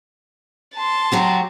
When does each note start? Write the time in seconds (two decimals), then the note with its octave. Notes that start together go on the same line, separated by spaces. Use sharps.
0.76 A5 C6
1.12 F#3 F#4 G4